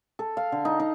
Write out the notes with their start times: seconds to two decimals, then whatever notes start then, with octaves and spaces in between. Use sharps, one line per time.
0.19 A4
0.37 F5
0.52 D3
0.65 D#4
0.80 D#4